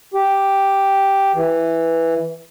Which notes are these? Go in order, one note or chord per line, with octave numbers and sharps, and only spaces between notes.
G4
E3